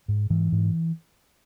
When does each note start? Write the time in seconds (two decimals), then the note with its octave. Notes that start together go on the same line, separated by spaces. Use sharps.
0.08 G#2
0.30 G#2 E3
0.52 G#2